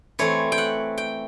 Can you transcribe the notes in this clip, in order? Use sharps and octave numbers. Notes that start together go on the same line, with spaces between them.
E3 A3 C4 C#5
G5
F#5
G5